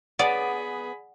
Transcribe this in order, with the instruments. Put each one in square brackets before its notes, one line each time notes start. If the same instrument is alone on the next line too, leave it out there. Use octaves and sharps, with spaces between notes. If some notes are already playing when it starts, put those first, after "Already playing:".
[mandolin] B3 [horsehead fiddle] G#4 B5 [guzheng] D5 [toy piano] F#5 G#5